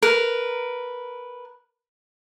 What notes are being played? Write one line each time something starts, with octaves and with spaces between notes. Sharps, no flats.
A#4 B4